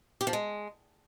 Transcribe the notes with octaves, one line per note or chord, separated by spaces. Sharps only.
G4
F3
G#3